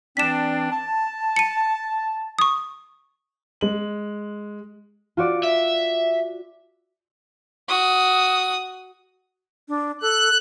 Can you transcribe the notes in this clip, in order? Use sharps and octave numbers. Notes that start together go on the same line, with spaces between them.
E3 C4 D4 B6 E7
A5
C#7 D#7
C#6 D#6
G#3 F#7
F4 F#4 D5
E5
F#4 D#6
D4
A4 F#6